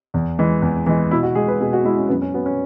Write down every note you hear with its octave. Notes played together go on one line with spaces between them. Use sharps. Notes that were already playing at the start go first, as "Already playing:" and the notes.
E2
E3 G#3
E2
E3 G#3
B2 E4
F#4
G#3 G#4
B4
B2 G#4
F#4
G#3 E4
C#4
F#2 B3
C#4
F#3 B3
C#4